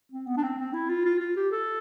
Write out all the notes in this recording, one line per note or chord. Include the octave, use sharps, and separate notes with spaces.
C4
B3
D4
C4
C4
E4
F4
F4
F4
G4
A4